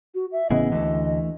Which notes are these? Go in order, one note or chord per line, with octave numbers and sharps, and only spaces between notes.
F#4
E5
A1 C#3 B3 E4 G#4 D#5
D2 E3 A3